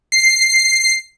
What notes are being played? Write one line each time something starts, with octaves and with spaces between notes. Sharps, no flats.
C7